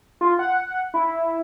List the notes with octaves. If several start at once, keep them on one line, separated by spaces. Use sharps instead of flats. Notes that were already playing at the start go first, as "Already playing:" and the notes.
F4
F#5
E4